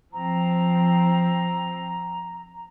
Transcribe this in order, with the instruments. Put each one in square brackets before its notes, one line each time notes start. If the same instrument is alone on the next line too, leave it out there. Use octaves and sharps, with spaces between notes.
[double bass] F3 C4 [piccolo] A#5